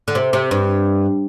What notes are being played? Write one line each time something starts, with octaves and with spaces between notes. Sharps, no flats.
D3
C3
C3
G2